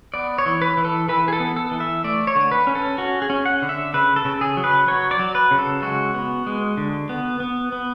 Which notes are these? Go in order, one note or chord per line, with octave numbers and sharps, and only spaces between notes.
B3 D5
C#5
E3
B4
E3
A4
E3 B4
G#4
A4
B3
A4
E3
E5
A3 D5
C#5
D3
B4
C#4
A4
C#4 F#4
G#4
C#4
F#5
D3
E5
C#3 B4
A4
C#3
G#4
F#3
B4
F#3 C#5
D5
F#3
B4
C#3
A4
G#3 F#4
B3
G#3
D3
B3
B3
B3